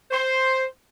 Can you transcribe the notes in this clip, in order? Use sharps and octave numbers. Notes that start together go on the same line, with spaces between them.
C5